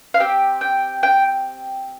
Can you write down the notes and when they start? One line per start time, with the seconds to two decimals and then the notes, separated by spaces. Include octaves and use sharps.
0.14 F5
0.20 C4 G4 G5
0.61 G5
1.03 G5